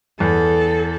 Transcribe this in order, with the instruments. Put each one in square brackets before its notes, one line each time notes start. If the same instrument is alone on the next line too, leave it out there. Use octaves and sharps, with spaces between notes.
[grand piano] E2 [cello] A4